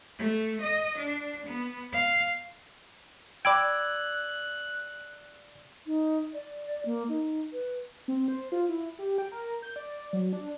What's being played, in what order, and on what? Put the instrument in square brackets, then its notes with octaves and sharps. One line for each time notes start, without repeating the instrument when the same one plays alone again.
[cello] A3
D#5
D4
B3
F5
[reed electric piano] D5 E6 G#6 [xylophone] G5 B5 D6 [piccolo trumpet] F#6
[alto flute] D#4
D5
A#3
D#4
B4
[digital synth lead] C4
C5
F4
E4
G4
G5
A#4
G6
D5
F#3
D4